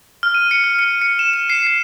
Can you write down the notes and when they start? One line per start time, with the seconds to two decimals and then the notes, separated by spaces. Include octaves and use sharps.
0.23 F6
0.34 D#7
0.51 C#7
0.64 F6
0.79 C#7
1.02 C#7
1.19 E7
1.34 E7
1.50 C7
1.67 C7